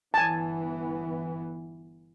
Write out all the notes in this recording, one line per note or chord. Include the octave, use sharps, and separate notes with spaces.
G1 E3 B3 G#5 A5